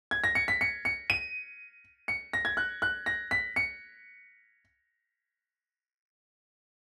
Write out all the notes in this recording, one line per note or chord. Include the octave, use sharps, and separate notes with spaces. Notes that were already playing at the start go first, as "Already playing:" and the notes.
G#6
A#6
C#7
B6
C#7
C#7
D#7
C#7
A#6
G#6
F#6
F#6
A#6
B6
C#7